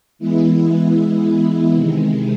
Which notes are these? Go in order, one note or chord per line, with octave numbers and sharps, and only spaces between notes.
E3 G#3 B3 E4
C3 D#3 G#3